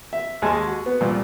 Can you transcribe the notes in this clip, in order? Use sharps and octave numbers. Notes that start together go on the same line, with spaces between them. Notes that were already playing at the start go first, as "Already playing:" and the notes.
E5
D#2 G#3 G#5 A5
F#4
B3
C2 A#2